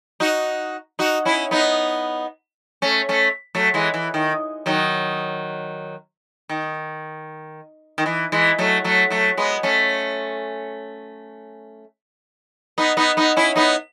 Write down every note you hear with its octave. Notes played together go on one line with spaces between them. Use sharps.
D#4 F#4
D#4 F#4
C#4 E4
B3 D#4
A3 C#4
A3 C#4
F#3 A3
E3 G#3
E3
D#3
D#3 F#3
D#3
D#3
E3
E3 G#3
F#3 A3
F#3 A3
F#3 A3
G#3 B3
A3 C#4
B3 D#4
B3 D#4
B3 D#4
C#4 E4
B3 D#4